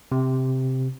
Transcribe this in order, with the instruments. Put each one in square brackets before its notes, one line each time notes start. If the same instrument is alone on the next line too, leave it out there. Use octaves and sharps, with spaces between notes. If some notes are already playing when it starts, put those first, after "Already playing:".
[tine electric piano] C3